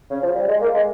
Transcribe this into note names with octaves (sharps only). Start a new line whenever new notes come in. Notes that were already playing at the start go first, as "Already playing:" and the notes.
C#3
F3
G3
G#3
A#3
G#3